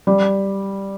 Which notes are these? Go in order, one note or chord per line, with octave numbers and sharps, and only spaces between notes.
G3